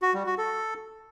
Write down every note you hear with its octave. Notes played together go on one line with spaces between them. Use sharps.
F#4
G3
F#4
A4